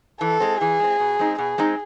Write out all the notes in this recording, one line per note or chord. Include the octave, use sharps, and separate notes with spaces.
E3 A4
G#3 C4
E3 G#4
G#3 C4
B2
G#3 C4 D#4
B2 G#4
G#3 C4 D#4